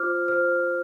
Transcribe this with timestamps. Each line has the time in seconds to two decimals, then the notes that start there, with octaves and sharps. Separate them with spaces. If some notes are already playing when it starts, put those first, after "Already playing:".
Already playing: F4 C5 D6 F6
0.28 C5 F6